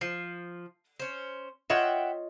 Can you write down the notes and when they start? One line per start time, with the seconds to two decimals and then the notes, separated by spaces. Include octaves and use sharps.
0.01 F3 C7
1.00 C#4 C5
1.70 F4 C#5 D#5 E5 F#5 G5